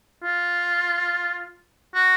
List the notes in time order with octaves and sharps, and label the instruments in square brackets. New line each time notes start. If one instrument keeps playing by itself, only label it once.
[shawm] F4
F#4